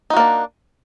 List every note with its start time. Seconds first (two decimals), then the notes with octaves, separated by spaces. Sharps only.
0.10 D#4
0.13 F#4
0.17 A#3
0.20 D4